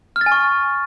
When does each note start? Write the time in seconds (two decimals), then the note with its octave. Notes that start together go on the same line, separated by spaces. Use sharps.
0.16 F6
0.21 A6
0.26 G#5
0.32 C#6